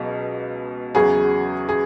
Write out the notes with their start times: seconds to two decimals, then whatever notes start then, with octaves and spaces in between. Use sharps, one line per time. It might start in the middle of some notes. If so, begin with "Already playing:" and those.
Already playing: C#2 B2 F#3
0.95 E2 C#3 F#3 G#4
1.69 G#4